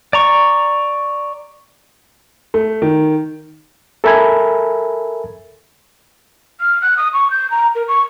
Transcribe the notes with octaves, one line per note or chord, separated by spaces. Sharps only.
D5 A#5 C#6
A3
D#3
A4 A#4 E5 G#5 B5 G#6
F6
F#6
D#6
C#6
G6
A#5
A#4
C#6